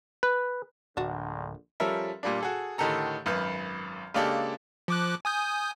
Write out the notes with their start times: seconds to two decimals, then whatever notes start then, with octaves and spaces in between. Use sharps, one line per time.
0.23 B4
0.97 D1 A#1 D3 D4 F#4
1.80 F3 G3 C#4 A4 A#4 E5
2.23 A#2 G3 A#3 D4
2.41 F#4 G#4 A4
2.78 A2 D3 D#3 G4 A4 A#5
3.26 G#1 F#2 B4 B5 F6 G6
4.14 C#3 G#3 A#3 D4 G4 A4
4.88 F3 D6 F#6
5.25 G#5 D#6 G6